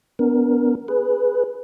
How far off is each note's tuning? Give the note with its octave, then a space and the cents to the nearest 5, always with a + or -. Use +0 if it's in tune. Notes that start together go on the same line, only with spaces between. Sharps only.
B3 +0 D4 -25 A#4 +10
G#4 +0 B4 +0